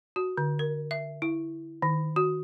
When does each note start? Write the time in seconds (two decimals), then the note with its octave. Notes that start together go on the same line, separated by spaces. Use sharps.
0.16 F#4
0.38 D3
0.59 A#4
0.91 E5
1.22 E4
1.82 D#3
2.16 F#4